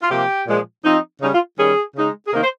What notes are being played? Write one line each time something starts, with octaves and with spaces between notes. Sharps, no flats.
F4
C3 F3 A#3 G4
A#2 F3 G#3
F3 C4 D#4
C#3 G3 C#4 D#4
F4
D#3 G3 C#4 G#4
C#3 G#3 D#4
G#4
C3 D#3 A#3 D#4 A#4
C5